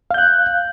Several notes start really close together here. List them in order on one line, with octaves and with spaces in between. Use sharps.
F5 G6 F#6